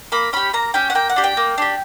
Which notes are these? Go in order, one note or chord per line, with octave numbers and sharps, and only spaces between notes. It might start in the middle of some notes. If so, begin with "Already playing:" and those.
A#3 B5
C#4 G4 B5
A#3 A#5
C#4 G4 G5
F#5
A#3 G5
F#5
D4 G4
G5
A#3
D4 G4